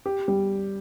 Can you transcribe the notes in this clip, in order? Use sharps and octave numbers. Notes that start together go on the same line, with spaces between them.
G4
G3